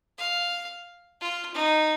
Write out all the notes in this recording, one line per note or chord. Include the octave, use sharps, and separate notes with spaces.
F5
F4
D#4